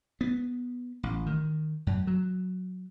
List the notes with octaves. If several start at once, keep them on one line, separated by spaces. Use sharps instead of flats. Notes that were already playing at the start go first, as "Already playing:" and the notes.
B3
A1
D#3
F#2
F#3